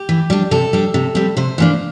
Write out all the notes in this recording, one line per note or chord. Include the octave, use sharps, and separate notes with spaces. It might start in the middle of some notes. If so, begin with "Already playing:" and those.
Already playing: G4
E3
G3 D4
C3 A4
G3 D4
C3
G3 C4
C3 C5
E3 A#3 D4